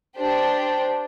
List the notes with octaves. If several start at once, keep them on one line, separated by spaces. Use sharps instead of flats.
D4 G4 C5